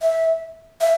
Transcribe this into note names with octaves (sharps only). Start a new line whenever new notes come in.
E5
E5